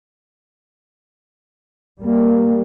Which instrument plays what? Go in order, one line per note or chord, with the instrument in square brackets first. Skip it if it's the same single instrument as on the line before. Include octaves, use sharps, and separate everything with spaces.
[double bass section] G3 A#3